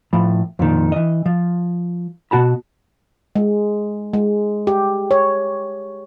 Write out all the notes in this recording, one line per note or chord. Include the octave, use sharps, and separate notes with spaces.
A2 F3 B5
F2 A#2 D#3
E3 D#5
F3
B2 F#4 A5 B5
G#3
G#3
G4
C#5